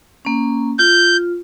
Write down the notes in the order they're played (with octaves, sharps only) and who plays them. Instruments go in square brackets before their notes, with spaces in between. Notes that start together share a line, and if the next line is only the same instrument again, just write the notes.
[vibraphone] A#3 C#4
[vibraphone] F4 [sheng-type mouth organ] G6